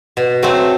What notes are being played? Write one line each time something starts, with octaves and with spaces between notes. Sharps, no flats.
B2
F#3 A3 C4